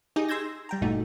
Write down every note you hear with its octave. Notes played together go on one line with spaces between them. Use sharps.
D#4 G4 G#4 D#5 G5
C6 E6 G6 G#6 A#6
G3 G5 A#5
G1 A#2 A3 D#4 F#4